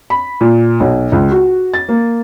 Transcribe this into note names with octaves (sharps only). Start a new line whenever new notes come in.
B5
A#2
B1
C#2
F#4
A6
A#3